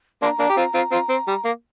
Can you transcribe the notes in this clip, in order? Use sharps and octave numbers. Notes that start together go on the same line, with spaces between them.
A#3 D4 C6
A#5
A#3 D4
G4
C4 F4
C4 F4
C4 F4
C4
G3
A#3